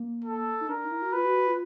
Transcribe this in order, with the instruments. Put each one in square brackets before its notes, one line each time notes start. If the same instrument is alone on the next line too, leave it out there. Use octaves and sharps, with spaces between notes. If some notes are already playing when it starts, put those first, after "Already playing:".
Already playing: [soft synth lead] A#3
[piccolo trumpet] A4
[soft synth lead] D#4
[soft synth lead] D4 [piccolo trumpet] A#4
[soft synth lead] D#4
E4
F#4
[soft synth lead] F4 [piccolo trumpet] B4
[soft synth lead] F#4
F#4
F4